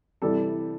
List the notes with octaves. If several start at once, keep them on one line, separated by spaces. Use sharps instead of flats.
C3 E3 G3 A4